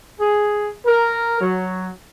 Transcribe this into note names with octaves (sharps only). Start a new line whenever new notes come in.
G#4
A#4
F#3